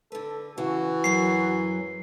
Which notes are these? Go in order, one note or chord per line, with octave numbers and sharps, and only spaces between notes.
D3 A4 B4
C#3 E3 F#4
F#2 F#3 G#4 C7